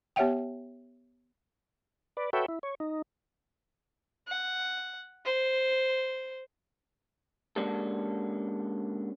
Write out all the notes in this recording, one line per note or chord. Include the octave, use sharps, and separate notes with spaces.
B3 G4 C#5 E5 F#5 G5
B4 D5
F#4 A4 B4 C#5 E5 G5
E4
C#5
D#4
F#5
C5
G#3 A#3 C#4 D4 G4 A4